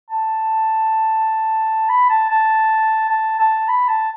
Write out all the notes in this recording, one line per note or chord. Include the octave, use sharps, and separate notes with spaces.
A5
B5
A5
A5
A5
A5
B5
A5